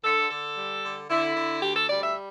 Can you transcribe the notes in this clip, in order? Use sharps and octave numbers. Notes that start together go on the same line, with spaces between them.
D3 A4
D3 A4
G3
D3
D3 E4
D3
D2 G4
A4
G3 D5
E5